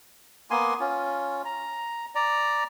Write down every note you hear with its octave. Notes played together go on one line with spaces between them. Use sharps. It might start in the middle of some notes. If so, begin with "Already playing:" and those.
A#3 B3 G#5 C6
C#4 F4
A#5
D5 A#5